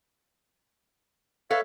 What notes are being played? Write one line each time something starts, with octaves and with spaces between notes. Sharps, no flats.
A4 B4 C#5 E5 F5